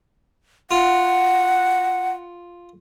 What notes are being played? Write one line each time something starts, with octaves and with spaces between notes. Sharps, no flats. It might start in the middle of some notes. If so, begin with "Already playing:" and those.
F4 F#5